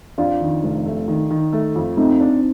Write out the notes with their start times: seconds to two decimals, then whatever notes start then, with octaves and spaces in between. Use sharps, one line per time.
0.18 F2 D4 F4
0.41 D#3
0.63 F1
0.86 A3
1.08 D#3
1.31 D#3
1.53 A3
1.76 F2
1.97 A3 C4 D#4
2.21 D4